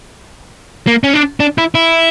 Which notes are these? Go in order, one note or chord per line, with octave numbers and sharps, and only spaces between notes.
A#3
C#4
D4
D4
E4
E4